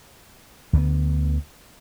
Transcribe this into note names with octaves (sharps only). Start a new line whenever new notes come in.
D2 D3 F#3 B3